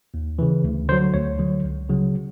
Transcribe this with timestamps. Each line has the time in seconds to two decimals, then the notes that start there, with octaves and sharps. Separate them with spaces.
0.14 D#2
0.39 C#3 E3
0.64 D2
0.89 D3 C5
0.92 F#3
1.14 D2 C#5
1.39 D3 F#3
1.64 C#2
1.89 C#3 F#3